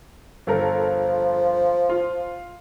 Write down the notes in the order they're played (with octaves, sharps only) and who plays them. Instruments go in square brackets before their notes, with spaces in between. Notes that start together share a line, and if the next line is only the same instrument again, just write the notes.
[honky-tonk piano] G1 A4 A#4 [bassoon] F3
[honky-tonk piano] F4